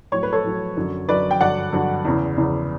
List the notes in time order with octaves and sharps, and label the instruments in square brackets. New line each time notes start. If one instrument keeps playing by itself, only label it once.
[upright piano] A2 F#3 C#5
B4
A4 C#5
A2 F#3
F#2 D3 F#3
F#2 D3 F#3 B4 D5
G5
G2 D3 F#3 D5 F#5
G2 D3 F#3
E2 C#3 E3
E2 C#3 E3